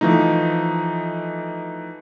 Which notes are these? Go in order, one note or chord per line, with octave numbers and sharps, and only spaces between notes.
E3 F3 A3 D#4